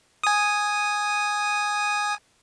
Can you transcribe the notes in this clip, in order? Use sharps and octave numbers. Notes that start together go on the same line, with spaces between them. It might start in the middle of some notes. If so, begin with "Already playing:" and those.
G#5 D#6